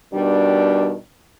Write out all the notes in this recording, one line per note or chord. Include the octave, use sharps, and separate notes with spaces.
B2 D#3 G3 D4